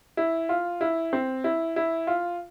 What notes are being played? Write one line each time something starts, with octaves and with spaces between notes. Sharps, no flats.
E4
F4
E4
C4
E4
E4
F4